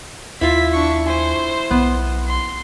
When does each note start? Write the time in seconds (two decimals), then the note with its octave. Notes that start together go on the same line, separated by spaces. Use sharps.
0.41 D#2 E4 F4 B6
0.73 D4 C#6
1.06 C5 G#5
1.71 B1 B3
2.28 C6